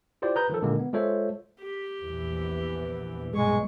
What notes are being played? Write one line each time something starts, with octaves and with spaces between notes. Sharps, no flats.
E4 F4 G4 C5 D5
B4 A#5 D#6 G6
D#3 F3 A4
A#2 D3 D#3 G#3 A#3
B3
G#3 F4 A4 C5 C#5 E5
G4
A#1 E2 E3
B1 G2 A#2 G#3 G#4 C#6